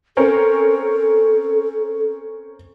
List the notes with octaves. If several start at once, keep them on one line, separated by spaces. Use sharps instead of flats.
C4 C#4 A4 A#4